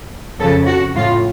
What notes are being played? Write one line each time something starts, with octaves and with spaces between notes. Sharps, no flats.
F2 C#3 A4
F#4
A2 F4